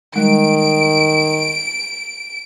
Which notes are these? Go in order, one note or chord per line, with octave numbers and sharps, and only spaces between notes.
D#3 G3 G#3 D7